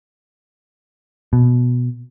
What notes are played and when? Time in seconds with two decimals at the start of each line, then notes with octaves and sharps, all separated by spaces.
1.33 B2